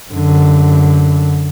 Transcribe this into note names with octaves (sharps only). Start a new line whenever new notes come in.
F#2 D3